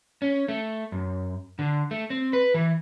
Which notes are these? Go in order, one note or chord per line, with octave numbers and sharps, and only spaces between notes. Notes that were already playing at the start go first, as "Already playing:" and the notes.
C#4
A3
F#2
D3
A3
C4
B4
E3